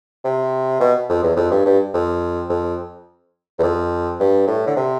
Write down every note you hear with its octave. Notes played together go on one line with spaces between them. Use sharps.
C3
B2
F2
E2
F2
G2
G2
F2
F2
E2
F2
G2
A2
D3
C3